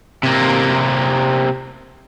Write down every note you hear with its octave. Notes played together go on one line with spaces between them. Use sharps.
C3 A#3